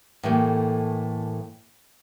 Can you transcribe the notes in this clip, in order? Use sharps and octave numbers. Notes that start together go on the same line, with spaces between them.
A2 E3 G3 A3 A#3